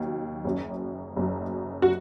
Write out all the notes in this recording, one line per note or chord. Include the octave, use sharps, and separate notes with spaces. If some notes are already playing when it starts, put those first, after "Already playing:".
Already playing: D#2 D#3 F#3
F#1 F#2 F#3
F#1 F#2 F#3
F#4